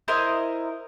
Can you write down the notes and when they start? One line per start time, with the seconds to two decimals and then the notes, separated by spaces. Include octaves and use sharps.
0.08 E4 A#4 C5 D#5